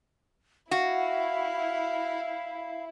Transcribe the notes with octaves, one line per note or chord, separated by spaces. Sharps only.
E4 F#4 F5